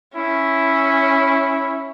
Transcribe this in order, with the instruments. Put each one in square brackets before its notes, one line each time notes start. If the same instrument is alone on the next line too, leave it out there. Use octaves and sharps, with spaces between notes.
[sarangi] C#4 [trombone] E4